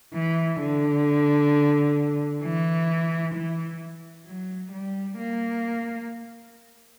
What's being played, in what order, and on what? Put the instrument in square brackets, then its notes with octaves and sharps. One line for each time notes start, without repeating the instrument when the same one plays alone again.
[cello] E3
D3
E3
E3
F#3
G3
A#3